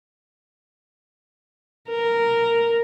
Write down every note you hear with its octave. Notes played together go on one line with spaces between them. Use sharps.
A#4